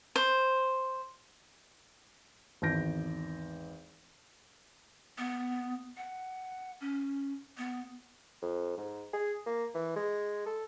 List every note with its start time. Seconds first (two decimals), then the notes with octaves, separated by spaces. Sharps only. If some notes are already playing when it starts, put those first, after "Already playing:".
0.16 C5
2.62 G#1 E2 A5 G6 A#6 D7
5.18 B3
5.97 F#5
6.81 C#4
7.58 B3
8.42 F2
8.77 G#2
9.13 G#4
9.46 A#3
9.74 E3
9.96 G#3
10.46 A4